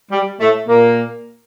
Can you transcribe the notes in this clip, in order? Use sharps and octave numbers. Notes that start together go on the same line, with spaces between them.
G3
A2 A3
A#2 A#3